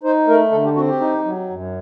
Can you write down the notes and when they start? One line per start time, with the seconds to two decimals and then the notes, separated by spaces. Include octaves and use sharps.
0.03 D#4 C5
0.28 A3 A#4
0.51 D3 A4
0.64 G4
0.76 C4 F#4
0.88 G4
1.01 D#4
1.25 F#3
1.50 F#2